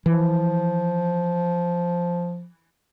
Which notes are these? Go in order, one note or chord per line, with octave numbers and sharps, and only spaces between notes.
E3 F3